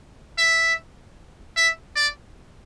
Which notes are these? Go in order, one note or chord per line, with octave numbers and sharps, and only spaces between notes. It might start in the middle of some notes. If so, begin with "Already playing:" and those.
E5
E5
D5